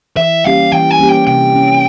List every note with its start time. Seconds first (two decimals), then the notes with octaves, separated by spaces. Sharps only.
0.17 E3 E5
0.45 G3 A#3 C#4 G4 F5
0.72 E3 G5
0.90 G#5
0.99 G3 A#3 C#4 G4
1.09 G5
1.27 C3 G5
1.55 G3 C#4